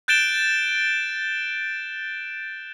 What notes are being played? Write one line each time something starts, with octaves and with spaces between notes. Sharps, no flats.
F#6 G6 A6 D7 E7 G7